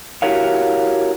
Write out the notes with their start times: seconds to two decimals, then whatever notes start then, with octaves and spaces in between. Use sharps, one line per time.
0.22 E4 F#4 G4 A#4 C#5 F5